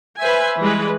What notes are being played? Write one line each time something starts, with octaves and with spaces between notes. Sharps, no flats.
B4 C5 E5 G#5
E3 G3 G#3 B4